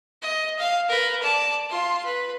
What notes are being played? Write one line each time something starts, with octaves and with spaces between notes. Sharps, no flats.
D#5
F5
A#4 B4
D5 A5
F4 C6
B4